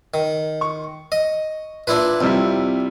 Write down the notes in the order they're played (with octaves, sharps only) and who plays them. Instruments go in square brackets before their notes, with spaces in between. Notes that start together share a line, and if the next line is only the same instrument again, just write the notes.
[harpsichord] D#3
[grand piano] C#6
[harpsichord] D#5
[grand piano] A#2 [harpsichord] D4 E4 B4
[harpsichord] F2 [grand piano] C3 G3 E4